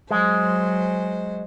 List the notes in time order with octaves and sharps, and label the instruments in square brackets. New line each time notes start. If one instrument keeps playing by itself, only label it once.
[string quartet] F#3 C5 [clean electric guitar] G#3